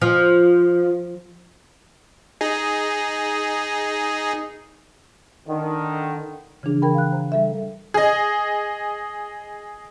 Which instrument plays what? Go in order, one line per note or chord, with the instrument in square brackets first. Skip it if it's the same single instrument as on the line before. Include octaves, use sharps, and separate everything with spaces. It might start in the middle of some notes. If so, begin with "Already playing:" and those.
[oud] F3
[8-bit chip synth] D#4 G#4
[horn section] D3 D#3
[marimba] C#3 E3 F3 D4 G#4
E3 A#4 G5 B5
F5 F#6
C5 A#5
G3 A4 E5
[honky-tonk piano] G#4 D#5